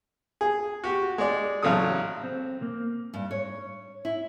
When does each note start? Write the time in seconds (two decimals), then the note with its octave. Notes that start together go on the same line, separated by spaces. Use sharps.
0.41 G#4
0.84 F#4 G4
1.18 G#3 D5
1.62 A1 C#3 F#3 A4 D#6
2.23 C4
2.62 A#3
3.14 G2
3.31 C#5
4.05 E4